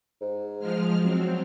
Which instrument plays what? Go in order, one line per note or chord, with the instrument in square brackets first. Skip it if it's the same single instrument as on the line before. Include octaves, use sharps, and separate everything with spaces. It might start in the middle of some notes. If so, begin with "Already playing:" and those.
[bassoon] G#2
[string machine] F3 G#3 F6
F#3 C4